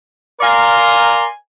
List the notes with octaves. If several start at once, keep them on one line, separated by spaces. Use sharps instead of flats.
A#4 D5 F5 G#5 A#5 C6